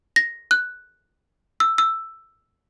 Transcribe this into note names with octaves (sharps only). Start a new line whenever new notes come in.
A#6
F#6
E6
E6